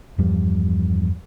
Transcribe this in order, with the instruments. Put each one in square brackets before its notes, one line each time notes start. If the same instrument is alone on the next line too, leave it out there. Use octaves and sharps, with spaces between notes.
[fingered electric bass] E2 G2 F3 G3